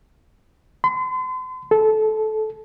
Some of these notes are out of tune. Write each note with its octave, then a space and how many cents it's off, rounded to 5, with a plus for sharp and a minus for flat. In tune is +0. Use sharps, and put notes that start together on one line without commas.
C6 -40
A4 -20